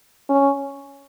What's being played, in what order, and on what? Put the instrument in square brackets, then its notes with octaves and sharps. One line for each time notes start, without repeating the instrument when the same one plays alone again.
[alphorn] C#4